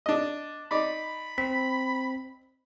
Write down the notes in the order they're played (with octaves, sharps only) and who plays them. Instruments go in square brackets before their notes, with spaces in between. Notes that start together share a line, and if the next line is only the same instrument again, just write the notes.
[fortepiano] D4 D#5
[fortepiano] D#4 D5 [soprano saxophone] B5
[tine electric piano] C4 [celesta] B6